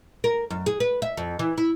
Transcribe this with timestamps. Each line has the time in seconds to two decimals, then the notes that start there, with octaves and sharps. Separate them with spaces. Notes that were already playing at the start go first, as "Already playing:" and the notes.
0.24 A#4
0.50 F#2
0.66 G#4
0.80 B4
1.02 E5
1.17 F2
1.39 E3
1.58 E4